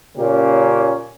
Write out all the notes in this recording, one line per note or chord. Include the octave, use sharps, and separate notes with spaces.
A#2 C#3 A#3 C#4 G4